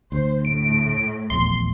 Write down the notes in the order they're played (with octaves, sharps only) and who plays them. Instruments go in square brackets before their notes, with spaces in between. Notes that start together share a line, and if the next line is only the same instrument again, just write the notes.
[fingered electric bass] D2 [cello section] C5
[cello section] A2 [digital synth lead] D7
[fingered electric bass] D#1 A#1 E2 [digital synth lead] C6